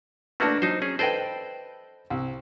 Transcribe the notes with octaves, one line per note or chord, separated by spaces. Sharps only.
A3 A#3 D4 F#4 B4
F#3 D#4 C5
C#4 G#4
A4 B4 C5 D5 D#5 G5
C2